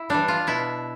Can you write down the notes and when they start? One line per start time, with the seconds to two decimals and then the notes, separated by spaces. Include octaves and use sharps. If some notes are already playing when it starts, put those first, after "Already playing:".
Already playing: E4
0.10 E3 G3 D4
0.28 F4
0.47 B2 E4